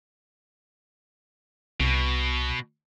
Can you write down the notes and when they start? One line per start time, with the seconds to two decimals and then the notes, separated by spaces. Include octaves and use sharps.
1.80 C2 B2